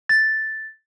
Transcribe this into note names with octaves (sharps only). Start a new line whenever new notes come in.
A6